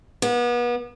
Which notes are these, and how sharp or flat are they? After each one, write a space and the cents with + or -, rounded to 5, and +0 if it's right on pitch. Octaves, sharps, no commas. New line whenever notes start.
B3 -35